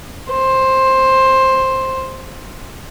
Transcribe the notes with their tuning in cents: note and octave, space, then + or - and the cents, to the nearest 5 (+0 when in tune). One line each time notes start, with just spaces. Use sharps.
C5 +10